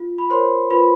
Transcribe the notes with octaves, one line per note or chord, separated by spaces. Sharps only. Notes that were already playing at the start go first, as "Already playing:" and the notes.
Already playing: F4
B5
A#4 C5 C#5 C6
F4 B4 B5